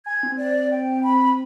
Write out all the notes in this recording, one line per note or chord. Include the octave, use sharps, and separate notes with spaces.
G#5 G#6
C4
D5
G5
B5